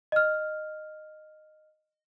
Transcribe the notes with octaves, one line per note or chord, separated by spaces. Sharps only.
D#5 F6